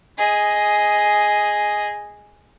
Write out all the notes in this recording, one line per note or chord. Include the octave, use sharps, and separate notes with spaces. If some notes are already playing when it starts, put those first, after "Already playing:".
G#4 D#5